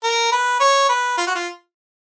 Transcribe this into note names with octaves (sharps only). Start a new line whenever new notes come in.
A#4
B4
C#5
B4
F4
F#4
F4